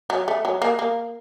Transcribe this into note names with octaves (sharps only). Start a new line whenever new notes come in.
F#3
A3
F#3
A#3
A#3